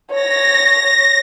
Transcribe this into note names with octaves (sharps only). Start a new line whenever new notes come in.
C#5 A#6